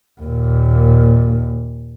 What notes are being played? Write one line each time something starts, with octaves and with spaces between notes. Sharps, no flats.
D#2 A#2